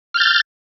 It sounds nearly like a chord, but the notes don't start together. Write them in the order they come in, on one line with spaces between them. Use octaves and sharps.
F6 G6 A6